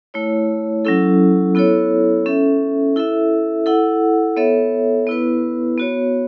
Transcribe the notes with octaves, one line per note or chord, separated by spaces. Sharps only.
A3 E4 C#5
F#3 C#4 E4 A4
B3 E4 A4 C#5
C#4 A4 E5
E4 A4 E5
E4 A4 F#5
B3 A4 C#5 E5
B3 E4 B4
B3 F#4 C#5